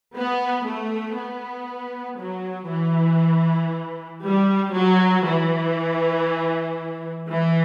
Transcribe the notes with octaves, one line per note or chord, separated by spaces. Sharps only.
B3
A3
B3
F#3
E3
G3
F#3
E3
E3